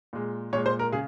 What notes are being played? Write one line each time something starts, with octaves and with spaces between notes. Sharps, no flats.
A#2 G#3
A#2 G#3 C#5
C5
A#4
C#3 G#4